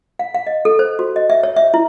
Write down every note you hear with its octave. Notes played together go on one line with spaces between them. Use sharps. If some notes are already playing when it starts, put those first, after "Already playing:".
F5
F5
D#5
A4
C5
F#4
D#5
E5
C#5
E5
E4